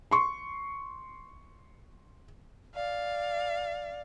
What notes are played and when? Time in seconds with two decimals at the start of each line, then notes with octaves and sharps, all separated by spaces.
0.11 C6 C#6
2.76 D5 F5